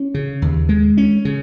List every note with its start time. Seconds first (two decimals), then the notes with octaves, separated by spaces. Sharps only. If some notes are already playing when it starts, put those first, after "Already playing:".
Already playing: C#4
0.14 C#3
0.42 D#2
0.69 G#3
0.97 C#4
1.25 C#3